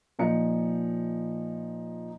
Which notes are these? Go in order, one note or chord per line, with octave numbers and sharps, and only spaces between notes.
A#2 F3 D#4 C#7